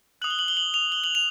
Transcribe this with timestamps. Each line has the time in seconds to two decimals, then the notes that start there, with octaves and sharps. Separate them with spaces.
0.22 D#6 F#6 F#7
0.30 G7
0.39 F#7
0.48 G7
0.57 F#7
0.74 F7
0.92 G7
1.04 F#7
1.15 F7